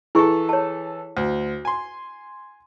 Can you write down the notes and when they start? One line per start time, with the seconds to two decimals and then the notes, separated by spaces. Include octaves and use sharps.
0.15 E3 E4 G#4 A4 C#6
0.49 C#5 A5
1.17 D2
1.65 G#5 C6